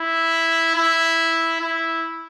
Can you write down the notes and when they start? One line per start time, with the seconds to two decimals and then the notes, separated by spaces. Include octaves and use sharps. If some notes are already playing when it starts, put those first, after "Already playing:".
Already playing: E4
0.75 E4
1.61 E4